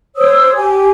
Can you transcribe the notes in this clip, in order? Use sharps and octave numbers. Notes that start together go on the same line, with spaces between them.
C5 C#5 D#6 E6
G4 G#5